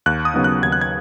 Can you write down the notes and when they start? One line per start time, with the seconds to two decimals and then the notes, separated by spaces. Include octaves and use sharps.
0.06 D#2 F#6
0.25 D#6
0.34 C#3 F#3 B3 D#4
0.44 F#6
0.63 D#2 G#6
0.72 F#6
0.81 G#6